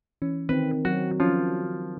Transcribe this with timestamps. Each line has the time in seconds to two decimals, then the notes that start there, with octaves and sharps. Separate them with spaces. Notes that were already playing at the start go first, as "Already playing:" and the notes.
0.22 E3 C#4
0.49 D#3 C4 B4
0.85 F#3 F#4
1.20 F3 C#4 F4